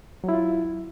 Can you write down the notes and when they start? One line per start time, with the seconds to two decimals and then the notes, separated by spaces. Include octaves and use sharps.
0.24 F#3
0.29 E4
0.33 F4